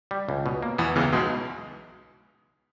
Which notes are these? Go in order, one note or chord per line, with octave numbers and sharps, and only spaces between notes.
G3
C#2
B2
A#3
E2 E3 B3
C#2 C#3 E3
B1 B2 G#3